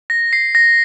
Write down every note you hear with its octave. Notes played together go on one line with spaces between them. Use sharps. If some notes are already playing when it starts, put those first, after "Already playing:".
A#6
C7
A#6